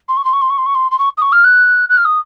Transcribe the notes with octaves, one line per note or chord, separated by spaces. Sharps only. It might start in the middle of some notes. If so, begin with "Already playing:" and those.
C6
C#6
C6
C#6
C6
C#6
C6
C#6
C6
C6
C#6
D#6
C#6
F6
F#6
F#6
F6
D#6